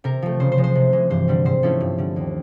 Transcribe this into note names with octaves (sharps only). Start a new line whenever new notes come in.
C3 A#4
F3 A3
C#3 C5
C5
F3 G#3
C5
C3
E3 G#3
G2 C5
D3 G3 C4
G#2 C5
F3 A3 C#4 E4 A4
G2
D3 G3
D#2